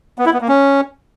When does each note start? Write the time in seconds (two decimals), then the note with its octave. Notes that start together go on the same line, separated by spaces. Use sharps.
0.18 B3
0.26 E4
0.33 B3
0.41 A#3
0.48 C#4